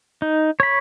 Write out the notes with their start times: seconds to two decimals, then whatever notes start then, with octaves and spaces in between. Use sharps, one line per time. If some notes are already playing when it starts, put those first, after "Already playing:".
0.22 D#4
0.60 C#5 B5